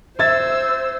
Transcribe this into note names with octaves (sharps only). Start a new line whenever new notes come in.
C5 E5 E6 G#6 A6